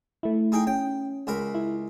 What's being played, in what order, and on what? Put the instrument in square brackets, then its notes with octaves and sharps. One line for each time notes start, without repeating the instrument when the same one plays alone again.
[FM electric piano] A3 E4
[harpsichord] D#4 G#4 G5
[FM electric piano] C#4 [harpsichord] G5
[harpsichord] C#2 A#4 B5
[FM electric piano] E4